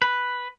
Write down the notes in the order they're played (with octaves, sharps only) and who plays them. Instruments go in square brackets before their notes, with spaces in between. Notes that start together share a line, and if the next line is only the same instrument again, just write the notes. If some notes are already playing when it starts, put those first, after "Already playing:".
[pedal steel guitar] B4